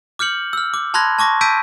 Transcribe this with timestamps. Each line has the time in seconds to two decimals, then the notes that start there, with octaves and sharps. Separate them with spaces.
0.19 D6 F6 G6 C#7 F#7
0.53 E6 F6
0.74 D6
0.94 A5 B5 C6 F#6 G#6 A#6
1.19 A5 C#6 D6 A#6
1.41 A5 E6 G6 B6 D7 D#7